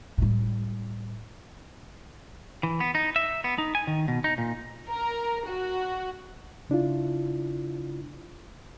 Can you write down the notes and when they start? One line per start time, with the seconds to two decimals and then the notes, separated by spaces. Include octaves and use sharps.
0.18 A2 G3
2.63 E3
2.80 B3
2.95 D#4
3.16 E5
3.44 B3
3.58 D#4
3.75 G#5
3.87 D#3
4.08 B2
4.24 D#4
4.38 A#2
4.88 A#4
5.48 F#4
6.70 C#3 D4 E4 F4